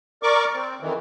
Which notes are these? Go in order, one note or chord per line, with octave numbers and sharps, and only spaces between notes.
A#4 D5 C#6 D6
C4
F2 D#3 E3